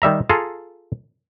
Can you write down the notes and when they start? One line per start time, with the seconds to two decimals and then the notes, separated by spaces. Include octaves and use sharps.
0.02 D#3 G3 E5 A#5
0.29 F4 G#4 A4 A#5